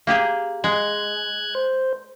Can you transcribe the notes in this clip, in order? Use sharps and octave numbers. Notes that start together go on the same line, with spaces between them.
A#3 G4 G#4
G#3 F#6 G#6
C5